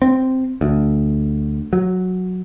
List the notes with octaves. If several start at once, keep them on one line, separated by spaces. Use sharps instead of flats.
C4
D2
F#3